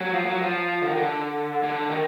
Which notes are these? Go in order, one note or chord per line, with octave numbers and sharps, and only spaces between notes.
F#3
F3
F#3
F3
D3
D#3
D3
D3
D#3